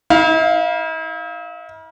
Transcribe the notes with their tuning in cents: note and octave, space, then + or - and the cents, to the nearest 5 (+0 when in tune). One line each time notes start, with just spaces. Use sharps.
E4 -45 F5 +0